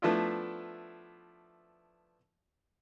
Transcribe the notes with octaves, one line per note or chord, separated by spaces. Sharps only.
F3 A3 B3 D4 E4 F4